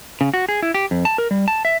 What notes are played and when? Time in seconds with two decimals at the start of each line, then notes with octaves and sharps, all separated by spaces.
0.21 C#3
0.34 F#4
0.49 G#4
0.62 E4
0.74 G4
0.91 F2
1.05 A5
1.18 A#4
1.31 G3
1.48 A5
1.65 E5